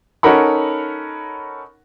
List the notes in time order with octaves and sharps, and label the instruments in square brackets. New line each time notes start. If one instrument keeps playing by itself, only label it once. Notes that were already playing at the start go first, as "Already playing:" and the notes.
[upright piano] C#4 D#4 A4 A#4 F#5 B5